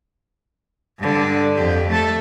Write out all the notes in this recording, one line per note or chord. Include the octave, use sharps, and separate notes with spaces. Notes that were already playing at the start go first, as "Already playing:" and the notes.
G2 D3
F2 G4
A3 A4